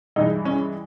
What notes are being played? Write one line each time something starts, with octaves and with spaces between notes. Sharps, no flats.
G2 E3 G#3 D#4
C#4